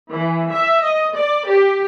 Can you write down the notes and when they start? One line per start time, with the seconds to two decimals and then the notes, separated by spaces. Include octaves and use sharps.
0.10 E3
0.51 E5
0.83 D#5
1.16 D5
1.50 G4